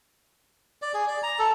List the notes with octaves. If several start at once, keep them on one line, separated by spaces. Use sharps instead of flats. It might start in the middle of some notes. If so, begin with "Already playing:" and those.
D5
G#4
D5
A#5
A4